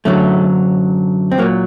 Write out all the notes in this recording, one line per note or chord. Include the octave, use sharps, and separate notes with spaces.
F#2 D3 F#3 A3
C4
A#2 F#3 A#3